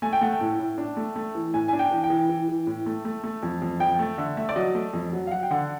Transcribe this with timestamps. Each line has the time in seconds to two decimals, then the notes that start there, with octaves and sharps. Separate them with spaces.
0.02 A3 G#5
0.13 G5
0.21 A3 F#5
0.32 G5
0.41 A2
0.59 A2
0.78 D4
0.97 A3
1.16 A3
1.35 E3
1.54 A2 G#5
1.68 D4 G#5
1.79 G5
1.91 E3
2.04 G5
2.10 E3
2.29 E3
2.49 E3
2.67 A2
2.86 A3
3.05 A3
3.24 A3
3.43 F2
3.62 F2
3.80 F2 G5
3.99 A3
4.18 D3 E5
4.37 A3 E5
4.49 D5
4.56 F#3 D#5
4.75 A3
4.93 F2
5.13 F#3
5.27 F5
5.31 F#3 F#5
5.43 G5
5.51 D3 F#5